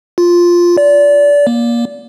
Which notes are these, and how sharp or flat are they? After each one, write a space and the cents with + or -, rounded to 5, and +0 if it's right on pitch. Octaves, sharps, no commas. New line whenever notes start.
F4 +0
D5 -25
A#3 +25